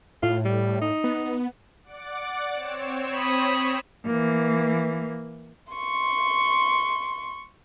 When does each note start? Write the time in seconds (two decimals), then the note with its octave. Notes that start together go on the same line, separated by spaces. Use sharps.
0.23 A2 F4
0.45 G3
0.81 D#4
1.04 B3
1.84 D5 F#5 D6
2.54 C4 C#5 E7
3.15 B5 D#6
4.06 E3 A#3
5.73 C6 C#6